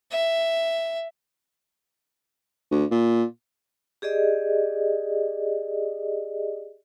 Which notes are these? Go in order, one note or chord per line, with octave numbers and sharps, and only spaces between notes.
E5
D2
A#2
G4 G#4 D5 D#5